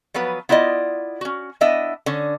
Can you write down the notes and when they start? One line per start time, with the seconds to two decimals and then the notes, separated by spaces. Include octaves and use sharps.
0.14 F3 F#3 B3 B4
0.49 B3 E4 F4 D5 D#5
1.21 C#4 F#4
1.61 B3 D4 E4 D#5 E5
2.06 D3 C#4